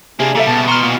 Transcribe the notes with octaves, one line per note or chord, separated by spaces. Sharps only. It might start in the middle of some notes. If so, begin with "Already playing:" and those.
C3 A#3 D4 G#4
C#3 G3 A#3 A4 E5
B2 A5
E3 F#4 A#5 C6 F6
A#2 E3 F6